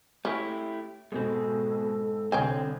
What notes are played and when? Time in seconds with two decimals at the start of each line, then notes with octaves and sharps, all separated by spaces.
0.25 A3 C#4 E4 G4
1.12 G#2 B2 G#3 C4 A4
2.32 C2 D3 C4 C#5 G5 G#5 G#6